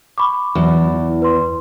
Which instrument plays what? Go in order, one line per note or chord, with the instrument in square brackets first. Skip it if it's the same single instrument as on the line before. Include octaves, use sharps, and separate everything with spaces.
[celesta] B5 C#6 D6
[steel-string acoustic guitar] E2 [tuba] F#3
[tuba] E3
[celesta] B4 C6